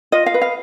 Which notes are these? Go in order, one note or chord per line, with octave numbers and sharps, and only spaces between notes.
F4 D#5
F5
B4
F5